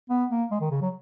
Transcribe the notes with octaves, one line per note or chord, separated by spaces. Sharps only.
B3
A#3
G#3
D#3
C#3
F#3